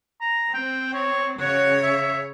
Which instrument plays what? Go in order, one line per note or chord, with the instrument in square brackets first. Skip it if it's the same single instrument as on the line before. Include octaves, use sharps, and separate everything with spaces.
[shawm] A#5
[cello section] C4 [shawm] G5
[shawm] C#5
[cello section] C#3 C#5 [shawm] F#4
[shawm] E5